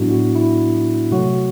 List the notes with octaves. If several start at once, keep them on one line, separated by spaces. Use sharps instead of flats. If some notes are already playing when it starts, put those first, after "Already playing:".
Already playing: A2 F#3 B3 D4 E4 F#4
F#4
E4
C3 F#3 A3 F#4